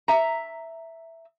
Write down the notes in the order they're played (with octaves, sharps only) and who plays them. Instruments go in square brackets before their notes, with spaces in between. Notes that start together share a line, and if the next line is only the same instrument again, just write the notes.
[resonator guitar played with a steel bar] E5 A#5